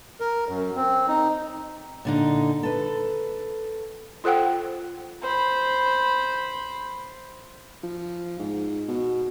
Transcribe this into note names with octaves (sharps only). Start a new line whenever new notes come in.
A#4
F#2
C4
D#4
A#2 D3 D#4
A4 B4
F4 A4 C5 F#5 G5
C5 B5
F3
G#2
B2